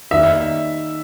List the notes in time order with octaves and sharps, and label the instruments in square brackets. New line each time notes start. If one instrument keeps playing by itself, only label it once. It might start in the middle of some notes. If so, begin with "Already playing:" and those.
[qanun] D#3 G3 A#3 [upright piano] E5